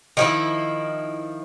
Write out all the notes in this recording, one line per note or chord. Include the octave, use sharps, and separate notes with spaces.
D#3 F3 E4